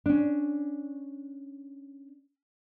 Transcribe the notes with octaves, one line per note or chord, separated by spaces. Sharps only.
C#4 D4